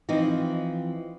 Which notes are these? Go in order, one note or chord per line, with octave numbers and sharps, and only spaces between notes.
E3 F3 C4 D#4